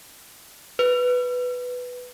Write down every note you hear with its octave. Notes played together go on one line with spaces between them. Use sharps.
B4